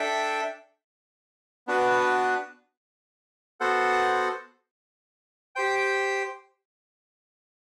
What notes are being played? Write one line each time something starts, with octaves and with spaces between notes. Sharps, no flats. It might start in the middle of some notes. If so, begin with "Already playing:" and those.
Already playing: D4 A4 E5 G5
B3 D4 F#4 B4
B3 F#4 A4 C5 F#5
G4 C5 G5